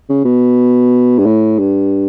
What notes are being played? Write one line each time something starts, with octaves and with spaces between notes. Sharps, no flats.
C#3
B2
G2
A2
G2